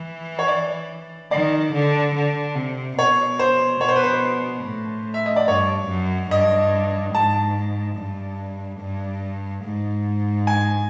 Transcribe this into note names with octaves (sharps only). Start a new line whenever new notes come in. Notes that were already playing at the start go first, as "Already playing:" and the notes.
Already playing: E3
C#5
D5
D#3 D5
D3
D3
C3
B2 C#5
C5
B2 C#5
C5
B4
C5
A2
E5
D#5
D5
G2 C#5
F#2
G2 D#5
G#2 A5
G2
G2
G#2
G#5